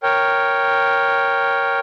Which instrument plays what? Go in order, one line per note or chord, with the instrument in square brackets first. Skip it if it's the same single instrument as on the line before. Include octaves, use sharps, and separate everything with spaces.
[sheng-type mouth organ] A#4 C#5 G5